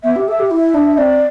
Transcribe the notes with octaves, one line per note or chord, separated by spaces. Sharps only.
B3 E5
G4
A4 E5
G4
E4
E5
D4
C4 D5